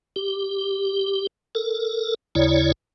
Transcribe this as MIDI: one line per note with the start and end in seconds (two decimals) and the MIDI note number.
0.16 1.27 67
1.55 2.15 69
1.55 2.15 70
2.35 2.72 39
2.35 2.72 49
2.35 2.72 64
2.35 2.72 73
2.35 2.72 74